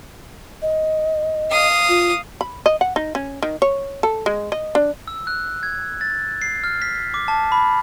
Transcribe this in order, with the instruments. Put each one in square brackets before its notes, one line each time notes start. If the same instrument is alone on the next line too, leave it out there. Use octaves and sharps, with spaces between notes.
[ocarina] D#5
[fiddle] F5 D#6
[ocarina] F4
[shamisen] B5
D#5
F#5
D#4
C#4
D#3
C#5
A4
G#3
D#5
D4
[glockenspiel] E6
F#6
G#6
A6
C7
F6
B6
B6
D6
A5
B5